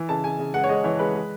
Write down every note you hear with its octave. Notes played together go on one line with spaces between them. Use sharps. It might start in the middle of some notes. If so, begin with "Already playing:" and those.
Already playing: E3
C#3 A5
C#3 G#5
C#3
G#3 F#5
C#5
G#3 D#5
E3 C#5
G#3 B4
G#3